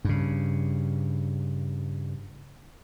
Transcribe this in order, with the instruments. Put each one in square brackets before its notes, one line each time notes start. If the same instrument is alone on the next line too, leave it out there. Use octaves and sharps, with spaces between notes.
[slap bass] G2 C#3